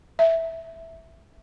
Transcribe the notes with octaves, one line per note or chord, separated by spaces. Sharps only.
E5